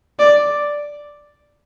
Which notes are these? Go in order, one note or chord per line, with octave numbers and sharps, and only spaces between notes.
D5